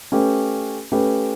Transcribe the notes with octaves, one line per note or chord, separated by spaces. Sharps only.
A3 C#4 G4 B4
A3 C#4 G4 B4